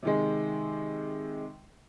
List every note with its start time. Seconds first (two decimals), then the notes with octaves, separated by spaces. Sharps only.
0.03 C3 D#3 G#3